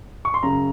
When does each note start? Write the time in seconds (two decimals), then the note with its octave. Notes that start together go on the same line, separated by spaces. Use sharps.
0.25 C#6
0.34 C6
0.43 F#2 C#3 A#5